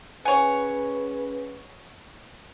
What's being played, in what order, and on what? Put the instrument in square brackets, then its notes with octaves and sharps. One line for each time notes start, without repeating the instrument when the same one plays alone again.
[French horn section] C#4 G#4 B4 [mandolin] C#5 F#5 [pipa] G#5